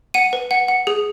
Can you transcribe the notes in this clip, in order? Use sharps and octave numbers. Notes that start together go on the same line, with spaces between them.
F#5 D#7
B4
F#5
F#5
G#4